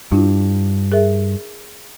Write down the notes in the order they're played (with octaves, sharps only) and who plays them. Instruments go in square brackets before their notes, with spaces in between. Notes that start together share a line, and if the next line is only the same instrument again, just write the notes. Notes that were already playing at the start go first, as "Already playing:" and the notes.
[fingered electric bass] G2 [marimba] D4 E4 F4
[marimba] G#4 A#4 E5